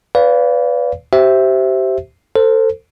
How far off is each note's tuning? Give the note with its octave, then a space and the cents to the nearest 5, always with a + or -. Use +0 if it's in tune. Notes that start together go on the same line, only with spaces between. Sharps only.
B4 +0 D5 -40 F5 +0
G4 -30 C5 +0 E5 +0
A4 +30 C5 +0